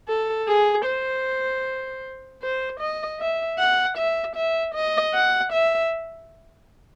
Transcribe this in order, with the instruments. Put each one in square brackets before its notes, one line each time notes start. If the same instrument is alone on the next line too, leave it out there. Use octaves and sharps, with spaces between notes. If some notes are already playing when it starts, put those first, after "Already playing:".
[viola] A4
G#4
C5
C5
D#5
E5
F#5
E5
E5
D#5
F#5
E5